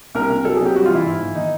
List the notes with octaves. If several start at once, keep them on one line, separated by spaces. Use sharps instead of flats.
C2 A#4
C2
F#3 A4
G#4
C3 G4
G3 F#4
F4
E3 E4
G#2
E3
D#3 D#4